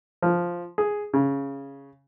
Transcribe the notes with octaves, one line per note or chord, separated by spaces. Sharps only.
F3
G#4
C#3